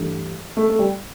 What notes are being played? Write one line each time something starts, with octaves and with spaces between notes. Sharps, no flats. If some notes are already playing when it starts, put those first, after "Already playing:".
Already playing: G2 E3 A3 D4 G4
A3
A3
G3